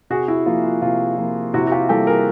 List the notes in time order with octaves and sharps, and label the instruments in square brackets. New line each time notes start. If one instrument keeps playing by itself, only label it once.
[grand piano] C3 F#4 G#4
E4 F#4
F3 A#3 F4
F4
C3 F4
F3 A#3
C3 E4 F#4
F#4
F4 G4
E3 G3 A#3 G4 A4
G#4 A#4